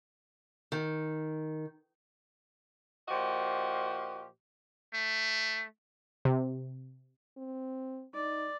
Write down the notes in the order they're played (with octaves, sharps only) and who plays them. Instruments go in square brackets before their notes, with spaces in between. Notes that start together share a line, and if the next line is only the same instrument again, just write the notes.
[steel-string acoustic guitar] D#3
[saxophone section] A#2 F3 F#4 G4 D#5
[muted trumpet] A3
[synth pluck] C3
[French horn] C4
[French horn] D#4 [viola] D5